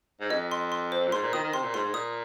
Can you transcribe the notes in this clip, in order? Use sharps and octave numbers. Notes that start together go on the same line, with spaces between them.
G#2
F2 D#5
C6
C6
C5
A#2
G#2 C6
A#2
D#3 D#6
D#3
C3 C6
A#2
G#2 C6
G#2
A#2 D#6